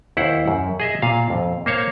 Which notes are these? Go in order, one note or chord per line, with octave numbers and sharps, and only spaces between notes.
D#2 E4 C5 F#5
F#2
G#4 D#5 E5
A#2 F5
F2
A#3 C5 C#5 F5